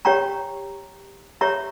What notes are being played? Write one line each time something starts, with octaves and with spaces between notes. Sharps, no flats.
G4 C#5 G5 A#5 C#6
G4 C#5 E5 A#5 C#6